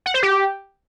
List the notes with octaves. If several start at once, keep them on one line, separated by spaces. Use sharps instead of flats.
F#5
C5
G4